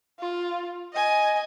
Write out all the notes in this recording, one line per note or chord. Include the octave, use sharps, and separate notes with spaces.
F4
D#5 G#5